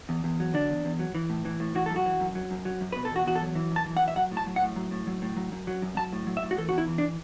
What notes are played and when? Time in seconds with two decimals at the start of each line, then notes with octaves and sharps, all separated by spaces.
0.09 E2
0.24 E2
0.40 F#3
0.54 D3 D4
0.70 E2
0.85 E2
0.99 F#3
1.15 E3
1.30 A2
1.45 E3
1.60 A2
1.75 E3 F#4
1.86 F#2 A4
1.96 F#4
2.06 E3
2.20 F#2
2.35 F#3
2.51 F#2
2.65 F#3
2.81 F#2
2.92 B2 B4
3.05 A4
3.11 E2 F#4
3.26 E2 F#4
3.36 A4
3.41 F#3
3.55 E3
3.71 F#2
3.76 A5
3.86 E3
3.97 F#5
4.02 F#2
4.08 E5
4.16 F#3 F#5
4.31 A2
4.37 A5
4.47 F#3
4.56 F#5
4.62 A2
4.76 F#3
4.91 A2
5.07 F#3
5.22 A2
5.36 F#3
5.52 F#2
5.67 F#3
5.82 F#2
5.97 F#3 A5
6.12 A2
6.27 F#3
6.37 E5
6.43 A2
6.51 F#4
6.58 E3 A4
6.69 E2 F#4
6.78 E4
6.87 E3
6.98 D4